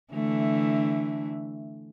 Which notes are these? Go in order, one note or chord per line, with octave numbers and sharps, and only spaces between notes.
D3 E3 A3